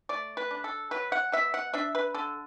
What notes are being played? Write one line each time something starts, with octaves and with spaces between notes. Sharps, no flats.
A3 D5
B4
D4
A4
F#3 B4
F#5
B2 E5
F#5
D4 E5
B4
D3 A4